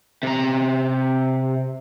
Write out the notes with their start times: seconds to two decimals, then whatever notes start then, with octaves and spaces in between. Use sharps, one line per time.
0.23 C3 A#5